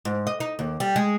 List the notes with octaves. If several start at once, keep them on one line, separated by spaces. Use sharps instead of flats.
G#2
D#5
D#4
D#2
G3
G#3